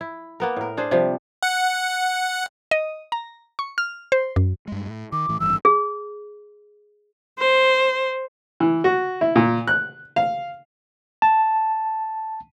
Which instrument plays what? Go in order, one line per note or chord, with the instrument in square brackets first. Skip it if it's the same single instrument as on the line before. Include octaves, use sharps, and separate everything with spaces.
[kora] E4
A#3 B3 A#4
A2 A#4
D4 G#4 C5
C3 F3 G3
[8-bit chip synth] F#5
[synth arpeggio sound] D#5
A#5
C#6
F6
C5
F#2
[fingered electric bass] G2 G#3
A2
[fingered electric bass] D#3 [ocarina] D6
[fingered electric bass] A2 E3
[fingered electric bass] G#1 G2 E3 [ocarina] E6
[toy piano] G#4
[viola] C5
[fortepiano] E3
F#4
E4
A#2
F#6
F5
[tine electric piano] A5